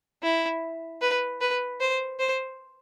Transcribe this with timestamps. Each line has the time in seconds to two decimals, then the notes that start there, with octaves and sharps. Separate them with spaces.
0.23 E4
1.02 B4
1.41 B4
1.81 C5
2.19 C5